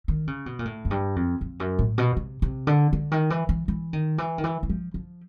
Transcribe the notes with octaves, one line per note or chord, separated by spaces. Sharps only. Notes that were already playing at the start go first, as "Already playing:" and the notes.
D#3
C#3
B2
A#2
A2
F#2
G2
F2
F2
F#2
A2
B2
C3
C3
D3
D3
D#3
E3
E3
E3
D#3
E3
D#3
E3
E3
F3
F3